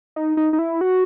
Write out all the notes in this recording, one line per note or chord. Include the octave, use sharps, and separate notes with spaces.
D#4
D#4
D#4
E4
F#4